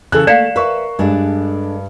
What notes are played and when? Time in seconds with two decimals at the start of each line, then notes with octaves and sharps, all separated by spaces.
0.12 C#3 E3 A4 F#6
0.27 A3 A#3 D5 F5 C7 C#7 E7
0.56 A#4 B4 E5 C#6
0.99 G2 G#3 D4 A4